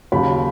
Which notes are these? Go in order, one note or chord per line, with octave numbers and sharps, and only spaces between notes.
D#2 C#3 F#3 B5